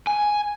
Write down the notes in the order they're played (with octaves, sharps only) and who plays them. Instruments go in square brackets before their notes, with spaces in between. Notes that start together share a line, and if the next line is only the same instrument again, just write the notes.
[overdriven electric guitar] G#5